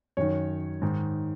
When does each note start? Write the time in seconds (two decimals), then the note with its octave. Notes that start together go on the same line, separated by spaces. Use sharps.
0.17 F#2 D#3 C#5
0.82 G#2 D#3